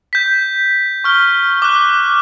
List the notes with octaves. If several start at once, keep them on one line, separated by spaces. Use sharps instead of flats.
G6 B6
C#6 F6 G7
D6 F#6